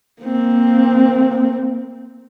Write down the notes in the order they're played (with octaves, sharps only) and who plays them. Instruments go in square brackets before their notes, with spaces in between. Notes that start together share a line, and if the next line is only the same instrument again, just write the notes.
[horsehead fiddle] A#3 C4